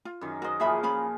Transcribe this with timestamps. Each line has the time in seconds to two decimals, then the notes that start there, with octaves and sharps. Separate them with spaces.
0.05 F4
0.21 F#2 D#3
0.42 F#4 A#4 C5 D#5
0.60 A#2 F3 F#4 G#4 E5 B5
0.83 C#4 F4 B5